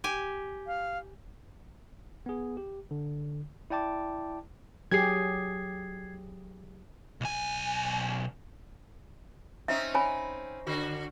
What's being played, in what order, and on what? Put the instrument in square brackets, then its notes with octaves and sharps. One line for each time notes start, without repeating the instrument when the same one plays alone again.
[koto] G4 G#5
[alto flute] F5
[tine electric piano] B3 G#4
G4
D3
E4 D5 G5 A5 D6
[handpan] F#3 G4 G#4 [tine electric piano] G#6 C7
[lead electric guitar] B1 G#5
[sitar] C4 C#4 D#4 [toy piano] E5
[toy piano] C#5 G#5 B5
[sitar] D3 F#4